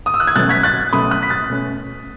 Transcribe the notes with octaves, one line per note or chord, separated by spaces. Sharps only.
D#6
E6
F#6
G#6
B2 F#3 A3 C#4 F#6 A6
G#6 B6
F#6 A6
B2 F#3 A3 C#4 B5 D#6
D#6 F#6
B6
F#6 A6
B2 A3 C#4